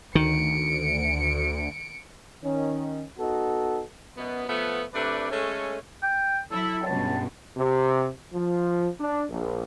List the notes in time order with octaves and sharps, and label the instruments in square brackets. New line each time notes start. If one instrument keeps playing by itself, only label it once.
[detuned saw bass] D2 [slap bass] D#3 [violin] C#7 D7
[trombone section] D#3 C#4
B3 D#4 F#4 A4
[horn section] F#2 B2 B3
F3 A3 B3
C3 A3 D4 B4 D5
G#3 A3 C#4 A4 C#5
[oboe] G5
[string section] F#3 E4 [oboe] A4
[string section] C#2 G2 B2 [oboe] A5
[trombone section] C3
F3
D4
A#1